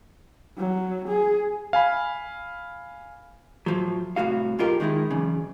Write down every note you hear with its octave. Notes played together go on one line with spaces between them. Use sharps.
F#3
G#4
F5 G#5 B5
A2 F3 F#3
C2 A2 F#4 F5
B1 G#2 F4 G4 A#4 D#5
D#3 G#3 D#4 E4
B1 E2 C#3